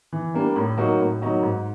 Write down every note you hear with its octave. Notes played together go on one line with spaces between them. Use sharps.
E3
G3 A#3 D4
A2
F#3 A#3 D#4 F#4
A2
F#3 A#3 D#4 F#4
G#2